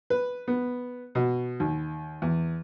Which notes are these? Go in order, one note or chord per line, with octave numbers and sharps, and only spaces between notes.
B4
B3
B2
D#2
E2